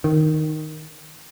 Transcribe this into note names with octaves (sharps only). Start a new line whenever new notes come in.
D#3